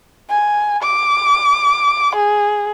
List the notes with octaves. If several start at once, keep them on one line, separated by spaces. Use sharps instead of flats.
G#5
D6
G#4